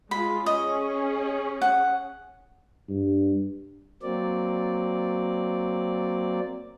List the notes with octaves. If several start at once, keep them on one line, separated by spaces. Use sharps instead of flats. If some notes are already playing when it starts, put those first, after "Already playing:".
G#3 F4 B5
C#4 G#4 D#5
F#5
G2
F#3 A#3 C4 D5